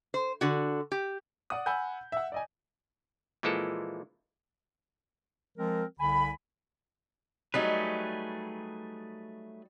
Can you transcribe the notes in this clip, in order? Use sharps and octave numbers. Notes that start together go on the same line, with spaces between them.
C5
D3 F#4
G4
D5 F#5 D#6
F#5 G#5 B5 E6 G6
E5 F#5
D5 D#5 G#5
A#2 E3 F3 G#3 E4 A4
F3 G#3 C4 A#4
C2 D3 G#5 B5
F#3 G3 A3 D#4 G#4 B4